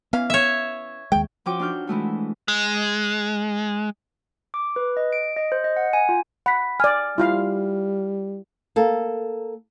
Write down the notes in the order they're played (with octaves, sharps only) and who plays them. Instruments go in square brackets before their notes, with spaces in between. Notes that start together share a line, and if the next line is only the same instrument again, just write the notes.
[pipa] E3 C#4 F5 [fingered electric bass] B3
[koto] C#5 E5
[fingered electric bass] D#2 G#3 [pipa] G5
[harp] F3 C#4 F#4 G5 D6
D4 D#4 F#4 F6 G6
E3 G#3 A3 F#4
[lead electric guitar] G#3
[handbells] D6
B4
D#5
D7
D#5
C5
D#5
F#5
G#5
F4
[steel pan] F#5 [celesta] B5 B6
[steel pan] D5 G#5 [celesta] F6
[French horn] G3 [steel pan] E4 F4 F5
[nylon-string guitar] A#3 A4